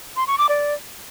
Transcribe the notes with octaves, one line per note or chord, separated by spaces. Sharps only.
C6
C#6
D6
D5